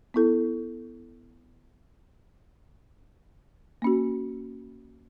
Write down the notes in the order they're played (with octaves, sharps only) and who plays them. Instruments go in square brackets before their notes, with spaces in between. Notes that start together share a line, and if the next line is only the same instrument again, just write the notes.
[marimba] B3 E4 A4
A#3 C#4 F#4